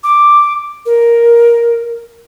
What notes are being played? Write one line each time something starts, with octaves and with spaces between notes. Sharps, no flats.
D6
A#4